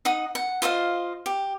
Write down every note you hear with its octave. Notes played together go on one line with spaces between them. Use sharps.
D#4 F#5 D#6
F#5
F4 C5 D#5 F5
G4